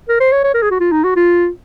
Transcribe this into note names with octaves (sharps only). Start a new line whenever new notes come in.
A#4
C5
C#5
C#5
A#4
G#4
F#4
F4
D#4
F#4
F4